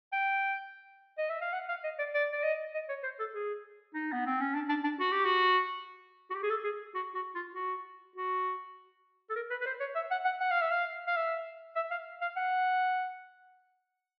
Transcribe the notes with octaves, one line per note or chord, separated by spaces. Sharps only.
G5
D#5
E5
F5
F#5
F5
D#5
D5
D5
D5
D#5
D#5
C#5
C5
A4
G#4
D#4
B3
C4
C#4
D4
D4
D4
F#4
G4
F#4
F#4
G4
G#4
A4
G#4
F#4
F#4
F4
F#4
F#4
A4
A#4
B4
B4
C5
C#5
E5
F#5
F#5
F#5
F5
E5
F5
F5
E5
E5
F5
F5
F#5